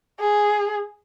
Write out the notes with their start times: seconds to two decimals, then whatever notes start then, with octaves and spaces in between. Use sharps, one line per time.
0.20 G#4